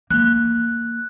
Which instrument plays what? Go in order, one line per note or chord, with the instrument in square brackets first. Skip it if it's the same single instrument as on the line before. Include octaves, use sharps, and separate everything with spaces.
[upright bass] A#3 [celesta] F#6